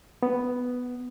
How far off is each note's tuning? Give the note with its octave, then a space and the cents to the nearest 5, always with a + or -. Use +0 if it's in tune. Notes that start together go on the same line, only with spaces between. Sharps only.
B3 +5